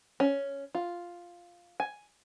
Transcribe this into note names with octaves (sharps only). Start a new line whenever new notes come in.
C#4
F4
G#5